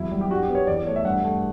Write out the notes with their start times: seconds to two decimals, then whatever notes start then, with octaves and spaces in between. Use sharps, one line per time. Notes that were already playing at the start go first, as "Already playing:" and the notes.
Already playing: E2 F#3 E4
0.11 G3
0.21 G4
0.31 G2 F#4
0.43 G4
0.49 B3
0.55 C#5
0.67 E2 D5
0.77 D5
0.86 A3 C#5
0.96 E5
1.05 G2 F#5
1.24 A3